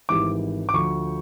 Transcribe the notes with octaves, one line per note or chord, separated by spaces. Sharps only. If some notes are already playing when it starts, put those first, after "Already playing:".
G#1 G#2 E3 G3 D6
D6
D2 D3 F3 C#6